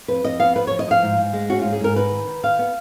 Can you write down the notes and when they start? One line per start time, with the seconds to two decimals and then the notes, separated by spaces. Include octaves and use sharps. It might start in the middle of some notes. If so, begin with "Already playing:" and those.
0.08 F2 B4
0.24 F2 D#5
0.40 B3 F5
0.55 F3 B4
0.67 F3 C#5
0.79 D#5
0.87 F3 F5
1.03 G#2
1.18 G#2
1.33 G#3
1.50 C#4 F#4
1.61 G#2 F4
1.73 G#4
1.80 G#2 A#4
1.96 D#4 B4
2.12 D#3
2.28 D#3
2.44 D#3 F5
2.59 B3